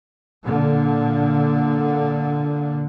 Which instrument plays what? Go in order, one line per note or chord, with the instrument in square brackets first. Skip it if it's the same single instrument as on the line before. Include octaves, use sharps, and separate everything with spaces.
[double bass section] A#2 D3